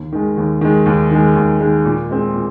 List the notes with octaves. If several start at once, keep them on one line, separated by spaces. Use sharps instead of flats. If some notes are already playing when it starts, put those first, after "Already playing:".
Already playing: D#2
D#3 G#3
D#2
D#3 G#3
D#2
D#3 G#3
D#2
D#3 G#3
A#2
G#3 C4
A#2